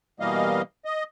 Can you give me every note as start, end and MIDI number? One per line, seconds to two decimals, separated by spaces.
0.20 0.62 47
0.20 0.62 52
0.20 0.62 55
0.20 0.62 58
0.20 0.62 75
0.20 0.62 77
0.85 1.03 75